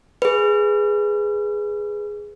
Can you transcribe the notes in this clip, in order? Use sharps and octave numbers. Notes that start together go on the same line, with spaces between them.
G#4 B4